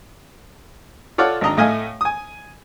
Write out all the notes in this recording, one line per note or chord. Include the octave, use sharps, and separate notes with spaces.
F4 A4 C#5 D5 F5 F#5
G#1 D4 D#5 A#5
A2 A3 D#5 F5 G#5
G#5 D#6